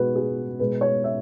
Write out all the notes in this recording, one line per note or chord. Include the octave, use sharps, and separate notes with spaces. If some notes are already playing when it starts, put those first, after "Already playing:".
Already playing: B2 G#3 F#4 B4
G#4
B2 G#3 B4
C#5
E5